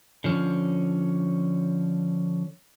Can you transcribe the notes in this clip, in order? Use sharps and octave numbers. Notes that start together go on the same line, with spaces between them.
D3 F3 C#4